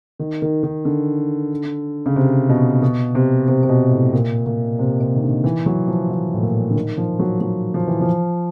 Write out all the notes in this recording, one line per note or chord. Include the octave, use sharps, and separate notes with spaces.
D#3
D#3
D#3
D3
C#3
C3
B2
B2
C3
C3
C3
B2
A2
A#2
A#2
C3
C3
D#3
D3
E3
F#3
F3
E3
A2
A#2
D3
D#3
F3
F#3
F#3
F3
E3
F3